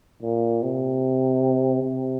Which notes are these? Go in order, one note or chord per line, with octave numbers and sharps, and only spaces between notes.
A#2
C3
C3